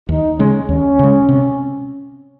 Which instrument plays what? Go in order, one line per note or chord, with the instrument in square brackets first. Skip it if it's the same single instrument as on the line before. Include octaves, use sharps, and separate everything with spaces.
[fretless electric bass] D#2 [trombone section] D#4
[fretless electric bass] C#3 G#3 [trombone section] C#4
[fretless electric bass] D#2 [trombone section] C#4
[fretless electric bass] C#3 G#3
C3